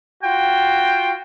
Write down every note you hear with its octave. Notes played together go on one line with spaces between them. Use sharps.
F4 F#4 G5